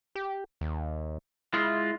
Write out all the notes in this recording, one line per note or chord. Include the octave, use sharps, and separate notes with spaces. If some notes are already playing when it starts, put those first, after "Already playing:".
G4
D#2
G#3 E4 F4